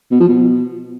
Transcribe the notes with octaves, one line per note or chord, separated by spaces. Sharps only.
B2
F3
B2